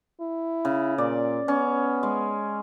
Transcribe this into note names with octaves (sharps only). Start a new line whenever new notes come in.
E4
C#3
A#2 D5
B3 C#4
G#3